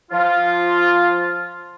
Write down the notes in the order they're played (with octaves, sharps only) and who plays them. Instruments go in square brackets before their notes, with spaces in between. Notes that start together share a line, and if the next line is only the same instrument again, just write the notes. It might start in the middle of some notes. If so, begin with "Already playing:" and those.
[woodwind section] F3 F4